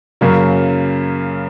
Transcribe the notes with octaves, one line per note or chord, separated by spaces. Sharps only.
F#2 C#3 F#3 A#3